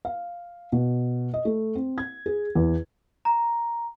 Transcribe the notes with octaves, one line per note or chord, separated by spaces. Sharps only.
F5
B2
D#5
A3
C4
G#6
G#4
E2
A#5